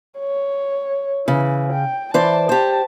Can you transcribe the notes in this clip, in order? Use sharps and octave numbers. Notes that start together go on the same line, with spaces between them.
C#5
C#3 E3
G5
E3 C5 D5 A5
G4 C5 A5